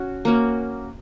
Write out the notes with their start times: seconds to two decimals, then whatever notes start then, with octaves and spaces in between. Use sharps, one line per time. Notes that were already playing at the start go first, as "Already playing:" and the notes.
Already playing: C#4 F#4
0.25 A#3 C#4 F#4